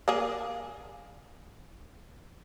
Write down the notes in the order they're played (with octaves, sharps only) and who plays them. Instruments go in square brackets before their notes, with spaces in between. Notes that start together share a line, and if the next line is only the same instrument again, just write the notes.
[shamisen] A#3 G#4